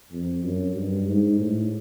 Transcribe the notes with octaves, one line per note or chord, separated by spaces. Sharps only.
F2
F#2
G2
G#2
A2